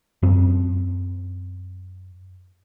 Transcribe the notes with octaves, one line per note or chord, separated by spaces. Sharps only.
F#2 C4